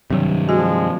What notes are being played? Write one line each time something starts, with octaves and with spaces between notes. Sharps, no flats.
G2 C3 D#3 F#3
F3 G#3 F#4